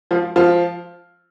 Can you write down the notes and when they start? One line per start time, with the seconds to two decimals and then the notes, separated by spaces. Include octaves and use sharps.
0.11 F3 F4
0.36 F3 F4